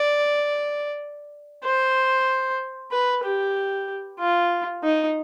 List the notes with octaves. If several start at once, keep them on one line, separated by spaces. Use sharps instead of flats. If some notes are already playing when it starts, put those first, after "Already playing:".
Already playing: D5
C5
B4
G4
F4
D#4